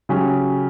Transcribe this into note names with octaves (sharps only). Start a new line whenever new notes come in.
C#3 F#3 C#4 G4